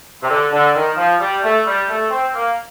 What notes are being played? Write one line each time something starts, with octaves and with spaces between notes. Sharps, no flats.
C3
D3
D3
D#3
F3
G3
A3
G3
A3
C4
A#3